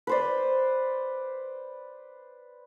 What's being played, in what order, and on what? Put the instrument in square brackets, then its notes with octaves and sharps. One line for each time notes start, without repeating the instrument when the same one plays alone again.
[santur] B4 C5 D5